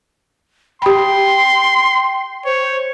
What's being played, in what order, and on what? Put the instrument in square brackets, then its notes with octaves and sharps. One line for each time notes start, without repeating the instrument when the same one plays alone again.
[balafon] G4 B5 [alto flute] G5 [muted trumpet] C6
[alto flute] C5 [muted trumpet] C#5